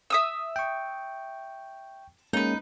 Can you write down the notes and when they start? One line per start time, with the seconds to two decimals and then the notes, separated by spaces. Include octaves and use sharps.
0.10 E5 D#6 E6
0.56 G5 C#6
2.33 G#3 A#3 C#4 D#4 B4